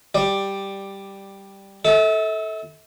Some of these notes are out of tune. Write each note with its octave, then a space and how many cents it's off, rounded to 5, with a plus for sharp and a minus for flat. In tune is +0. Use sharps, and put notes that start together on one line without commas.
G3 +0 D5 +10
A4 +0 E5 -40